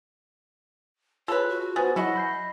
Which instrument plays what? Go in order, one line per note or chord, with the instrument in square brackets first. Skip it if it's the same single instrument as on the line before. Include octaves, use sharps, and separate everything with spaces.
[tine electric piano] F4 G#4 [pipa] A4 B4 [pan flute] C#5
[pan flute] F#4
[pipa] B3 G#4 [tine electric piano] C5 A6
[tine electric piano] F#3 G#5 C#7 [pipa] E4 F#4 [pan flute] D#5
[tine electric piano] B5 G6 C7